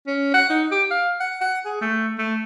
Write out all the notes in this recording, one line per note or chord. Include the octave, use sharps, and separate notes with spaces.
C#4
F#5
D#4
G4
F5
F#5
F#5
G#4
A3
A3